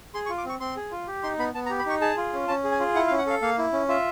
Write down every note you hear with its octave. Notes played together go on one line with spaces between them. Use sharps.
G#4 C6
C#6
F4
D6
C4 C#6
C4 C6
G#4
F4
G4
D#4 C6
B3 B5
B3 A5
A#5
G4
B5
D#4 C#6
G#4 A5
F4
C#4
C#4 A5
G#4
G#5
F4
E4 F#5
F5
C#4
F#5
A4 F5
A#3 F5
E4
C#4
F4 E5